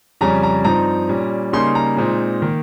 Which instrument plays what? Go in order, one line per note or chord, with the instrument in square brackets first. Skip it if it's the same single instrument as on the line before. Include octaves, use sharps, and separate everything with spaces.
[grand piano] F2 C#3 G3 C#4 A#5
A#5
G2 F3 C4 D#4 A#5
A#2 G3 C#4
C#3 G3 A#3 D#4 C6
A#5
A#2 G#3 C4 D#4
D#3 A#3